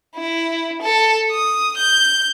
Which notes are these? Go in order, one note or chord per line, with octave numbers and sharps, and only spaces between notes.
E4
A4
D#6
G6